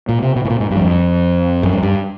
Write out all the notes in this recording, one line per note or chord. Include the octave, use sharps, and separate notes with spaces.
A#2
C3
B2
A2
A#2
G#2
G2
F#2
F2
F#2
G2
G2